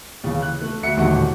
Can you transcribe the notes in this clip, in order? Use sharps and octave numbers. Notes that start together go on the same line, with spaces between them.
D#2 C#3 E3
F#6
A3
D2 F#4 E5 C#7
D#1 A2 D3 D#3 F#4 F#5